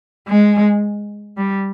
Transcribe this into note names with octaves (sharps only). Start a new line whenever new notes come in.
G#3
G3